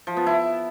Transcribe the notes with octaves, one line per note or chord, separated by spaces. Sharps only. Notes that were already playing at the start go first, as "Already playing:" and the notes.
F3
B3
E4